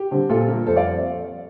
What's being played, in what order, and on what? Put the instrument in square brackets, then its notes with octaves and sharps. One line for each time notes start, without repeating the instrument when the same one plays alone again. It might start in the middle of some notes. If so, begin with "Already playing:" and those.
Already playing: [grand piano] G4
D3 G3 C4
A#2 F4 A4
G3 A#3
F2 A4 C5
D5 F5